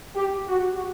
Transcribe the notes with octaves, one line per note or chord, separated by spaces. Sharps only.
G4
F#4